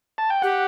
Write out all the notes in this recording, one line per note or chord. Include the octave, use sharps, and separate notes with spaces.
A5
G5
G4 F#5